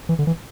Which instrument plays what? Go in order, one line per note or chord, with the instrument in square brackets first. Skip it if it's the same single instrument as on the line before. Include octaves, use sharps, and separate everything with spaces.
[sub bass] E3
D3
E3